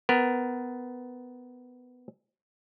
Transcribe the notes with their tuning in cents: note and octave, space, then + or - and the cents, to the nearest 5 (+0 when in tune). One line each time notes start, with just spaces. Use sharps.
B3 +15 A#4 +20